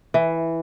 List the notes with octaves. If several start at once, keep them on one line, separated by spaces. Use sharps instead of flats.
E3